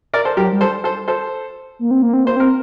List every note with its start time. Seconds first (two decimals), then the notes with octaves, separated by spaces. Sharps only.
0.14 A#4 D5
0.25 A4 C5
0.37 F#3 G4 A#4
0.53 G3
0.61 A4 C5
0.84 A4 C5
1.08 A4 C5
1.79 A#3
1.91 C4
2.02 A#3
2.13 C4
2.25 A#3 C5
2.36 C4 A#4